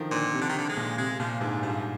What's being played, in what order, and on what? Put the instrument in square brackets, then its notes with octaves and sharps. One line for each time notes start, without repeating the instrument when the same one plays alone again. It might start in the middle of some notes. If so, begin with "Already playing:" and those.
Already playing: [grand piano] D3 D#3 F3
[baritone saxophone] A#2 [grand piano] D3
[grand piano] C3
[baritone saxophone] D3
D#3
D3
G#3
[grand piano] A#2
[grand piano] C3 [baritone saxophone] G#3
[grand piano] A#2 [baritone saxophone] F3
[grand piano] G#2 [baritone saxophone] D3
[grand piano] G2 [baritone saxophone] F3